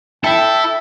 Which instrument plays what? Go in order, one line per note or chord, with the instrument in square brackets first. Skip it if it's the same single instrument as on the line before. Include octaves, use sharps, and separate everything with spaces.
[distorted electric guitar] E4 E5 [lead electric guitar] A4 [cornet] G5